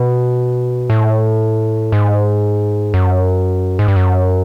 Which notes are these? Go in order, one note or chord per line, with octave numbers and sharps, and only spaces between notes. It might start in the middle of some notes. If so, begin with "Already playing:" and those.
Already playing: B2
A2
G#2
F#2
G#2
G2
F#2